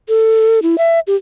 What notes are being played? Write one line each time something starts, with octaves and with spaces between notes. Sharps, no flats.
A4
E4
E5
G4